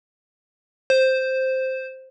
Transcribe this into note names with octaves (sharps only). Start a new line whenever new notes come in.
C5